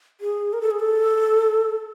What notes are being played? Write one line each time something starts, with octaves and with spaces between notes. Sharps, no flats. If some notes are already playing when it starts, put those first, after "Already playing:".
G#4
A#4
A4
G#4
A4